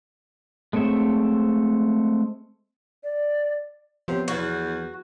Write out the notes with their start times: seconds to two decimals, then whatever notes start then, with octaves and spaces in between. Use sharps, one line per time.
0.73 G#3 A3 C4 C#5 E5
3.03 D5
4.08 C3 F3 B3 C#5
4.28 E2 F#4